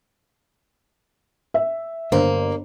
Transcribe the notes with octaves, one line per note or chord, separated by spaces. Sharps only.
E5
G1 A#3 C5